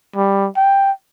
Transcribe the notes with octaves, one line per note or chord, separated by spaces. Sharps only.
G3
G5